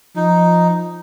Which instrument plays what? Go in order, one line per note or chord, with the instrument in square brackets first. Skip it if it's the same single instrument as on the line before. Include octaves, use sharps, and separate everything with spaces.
[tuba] F3 [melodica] D#4